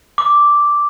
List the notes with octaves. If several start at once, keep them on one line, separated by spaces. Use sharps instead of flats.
D6